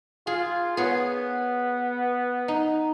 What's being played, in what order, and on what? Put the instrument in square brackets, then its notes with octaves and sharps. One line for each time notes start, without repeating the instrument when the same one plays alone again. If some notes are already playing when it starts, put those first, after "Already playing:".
[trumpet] F4 [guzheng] G#4
[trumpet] B3 [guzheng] G#4 C#5
[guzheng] D#4